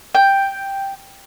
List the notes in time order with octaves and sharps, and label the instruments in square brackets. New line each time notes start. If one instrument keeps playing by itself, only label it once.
[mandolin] G5